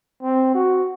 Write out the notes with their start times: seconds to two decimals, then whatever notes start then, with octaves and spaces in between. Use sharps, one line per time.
0.23 C4
0.55 F#4